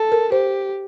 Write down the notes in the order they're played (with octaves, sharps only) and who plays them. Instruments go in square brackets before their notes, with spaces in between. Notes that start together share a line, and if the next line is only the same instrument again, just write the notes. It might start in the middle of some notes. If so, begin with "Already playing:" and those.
Already playing: [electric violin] A4
[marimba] A#4
[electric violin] G4 [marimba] C5